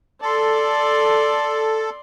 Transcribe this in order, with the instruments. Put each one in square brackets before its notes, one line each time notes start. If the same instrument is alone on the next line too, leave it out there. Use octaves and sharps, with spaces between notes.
[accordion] A4 [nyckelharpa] D5 C6